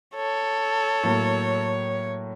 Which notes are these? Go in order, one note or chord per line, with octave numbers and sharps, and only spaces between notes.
A4 C#5
A2 F#3 A#3